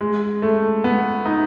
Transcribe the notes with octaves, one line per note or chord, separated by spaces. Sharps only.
G#3
A3
B3
D#4